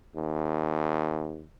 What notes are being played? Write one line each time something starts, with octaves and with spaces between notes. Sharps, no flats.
D#2